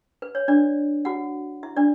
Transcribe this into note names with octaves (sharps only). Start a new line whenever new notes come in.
B4
C#5
D4 D5
F#4 F#5
E4 E5
D4 D5